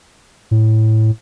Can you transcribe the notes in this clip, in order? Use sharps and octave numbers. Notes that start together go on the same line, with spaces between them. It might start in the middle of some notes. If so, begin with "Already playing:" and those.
A2